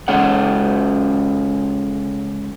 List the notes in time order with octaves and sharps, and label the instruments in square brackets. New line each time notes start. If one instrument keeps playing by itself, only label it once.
[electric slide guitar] C#3 G#3 C#4 A4 C#5 F#5